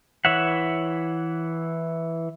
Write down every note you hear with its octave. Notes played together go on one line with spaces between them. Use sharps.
E3 C#5 E5 F#5